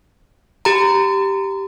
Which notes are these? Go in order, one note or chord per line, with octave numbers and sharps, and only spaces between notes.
G4 A#5